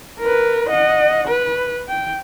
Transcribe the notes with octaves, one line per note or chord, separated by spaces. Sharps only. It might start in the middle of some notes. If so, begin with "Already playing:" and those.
A#4 B4
D#5 F#5
B4
G5